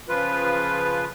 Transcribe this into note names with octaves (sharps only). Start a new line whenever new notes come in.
C#3 F3 F4 B4